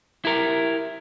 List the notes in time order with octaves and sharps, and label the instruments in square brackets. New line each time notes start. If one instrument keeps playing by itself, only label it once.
[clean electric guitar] E4 G4 A#4